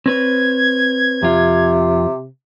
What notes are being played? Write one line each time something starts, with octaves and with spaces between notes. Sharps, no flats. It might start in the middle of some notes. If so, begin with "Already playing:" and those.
C4 B4 C#5 G#6
F2 C3 F4